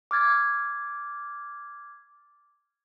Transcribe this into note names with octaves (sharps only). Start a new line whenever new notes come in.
D6 F6 G#6 A6